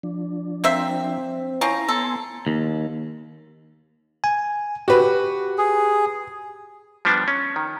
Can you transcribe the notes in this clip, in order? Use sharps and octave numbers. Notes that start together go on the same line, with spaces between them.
F3 D4
A#3 C4 C5 E5
F3 C4 C#4 E4 A#5
B3 A4 G#5 C6
D#2
G#5
F#4 G4 B4
G#4
F3 G3 B3 D4
C#4
D#3